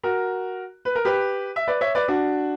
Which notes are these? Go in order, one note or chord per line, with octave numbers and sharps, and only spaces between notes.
F#4 A#4
B4
A#4
G4 B4
E5
B4 D5
C#5 E5
B4 D5
D4 F#4